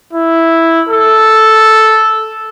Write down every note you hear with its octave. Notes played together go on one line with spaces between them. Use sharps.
E4
A4